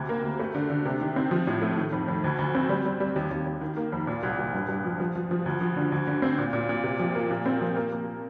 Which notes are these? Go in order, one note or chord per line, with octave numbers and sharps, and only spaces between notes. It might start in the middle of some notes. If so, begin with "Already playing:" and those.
Already playing: D2 C3
A#3
D2
A3
D3
D3
C3
D#3
C4
F3
A2
A3
D#3
F2
F2
D2
D2
C4
G3
G3
G3
D#2
D#2
D#2
D#3
A#3
F2
A#2
C2
C2
G2
G2
F3
F3
F3
F3
D2
F3
D3
D2
D3
C4
A#2
A#2
A#2
C3
F3
A#3
A#2
C4
F3
A#3
A#3